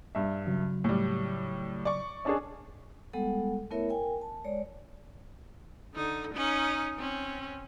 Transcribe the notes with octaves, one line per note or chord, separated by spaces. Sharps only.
G2 E5
C#3 F#3
A2 G3
D5 C#6
C#4 D4 G#4 D#5 A5 C#6
G3 G#3 B3 A4 F#5
A3 B3 E4 A#4 C#5 E5
A#4 G5 G#5
A5
G#3 C#5 D5
D3 D#4
C#4 D#4
C4 C#4